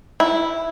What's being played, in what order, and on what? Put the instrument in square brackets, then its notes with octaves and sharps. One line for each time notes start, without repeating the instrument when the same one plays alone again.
[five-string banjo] E4